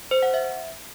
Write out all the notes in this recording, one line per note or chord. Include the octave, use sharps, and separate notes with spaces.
C5
F#5
E5